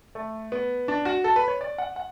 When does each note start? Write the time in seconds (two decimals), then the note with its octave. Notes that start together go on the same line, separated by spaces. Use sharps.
0.15 A3
0.52 B3
0.88 D4
1.05 F#4
1.24 A4
1.36 B4
1.48 C#5
1.61 D5
1.78 F#5
1.96 F#5